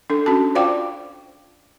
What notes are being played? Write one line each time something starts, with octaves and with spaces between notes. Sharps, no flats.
D4 A4
C#4 F#4 A5
F4 C5 D5 F5 G5 D6